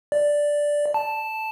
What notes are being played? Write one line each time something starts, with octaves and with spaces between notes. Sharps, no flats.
D5
A5